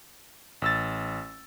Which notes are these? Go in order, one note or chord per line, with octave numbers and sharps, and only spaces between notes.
A1 E6 A6